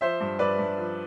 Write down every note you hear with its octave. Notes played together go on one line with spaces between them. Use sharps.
F3 C5 E5
G2
G2 B4 D5
G2
F3